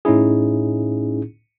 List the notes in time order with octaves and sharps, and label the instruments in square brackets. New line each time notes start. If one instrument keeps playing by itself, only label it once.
[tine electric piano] A2 C#4 D#4 E4 G#4